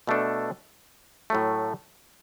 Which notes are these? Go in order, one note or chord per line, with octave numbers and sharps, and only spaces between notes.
B2 A3 D4 A4
A2 F#3 A3